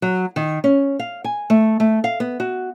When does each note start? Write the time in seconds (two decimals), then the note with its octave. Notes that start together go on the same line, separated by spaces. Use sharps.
0.02 F#3
0.36 D#3
0.64 C#4
0.99 F5
1.24 G#5
1.50 A3
1.80 A3
2.04 F5
2.20 B3
2.40 F#4